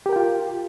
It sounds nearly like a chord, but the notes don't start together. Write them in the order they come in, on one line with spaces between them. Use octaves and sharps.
G4 A#4 G5 F4